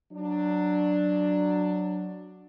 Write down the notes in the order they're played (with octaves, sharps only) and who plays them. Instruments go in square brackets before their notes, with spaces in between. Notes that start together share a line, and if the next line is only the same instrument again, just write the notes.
[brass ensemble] F#3 D4